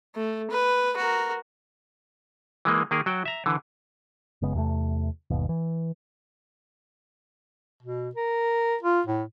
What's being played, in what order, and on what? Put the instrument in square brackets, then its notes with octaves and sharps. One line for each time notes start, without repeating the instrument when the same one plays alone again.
[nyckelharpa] A3
B4
F#4 A#4
[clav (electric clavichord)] E3 G#3 A#3
D#3 A#3 G#4 A#4
F#3 F#4 G5
E5 A#5
D3 E3
[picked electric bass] F#1 C#3 G#3 B3
E2 C3 G#3 A3
G1 D#2 B2
E3
[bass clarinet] B2
A#4
F4
A2